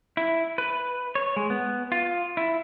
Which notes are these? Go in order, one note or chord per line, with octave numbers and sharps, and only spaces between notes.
E4
B4
C#5
G#3
B3
F4
E4